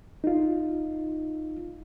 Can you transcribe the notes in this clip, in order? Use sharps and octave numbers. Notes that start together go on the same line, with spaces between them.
D#4 F4